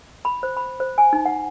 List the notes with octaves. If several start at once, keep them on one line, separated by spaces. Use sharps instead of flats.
B5
C5
B5
C5
G#5
D#4
F#5